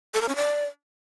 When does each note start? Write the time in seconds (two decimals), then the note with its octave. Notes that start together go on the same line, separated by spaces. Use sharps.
0.14 A4
0.21 A#4
0.29 C#4
0.36 D5